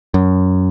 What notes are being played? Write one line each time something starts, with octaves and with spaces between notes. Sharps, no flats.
F#2